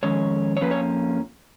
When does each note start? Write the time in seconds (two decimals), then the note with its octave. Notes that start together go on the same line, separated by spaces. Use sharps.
0.03 F2 D#3 G#3 C#4 C#5
0.57 C#5
0.61 F2 F3 A#3 C#4 B4
0.71 C#5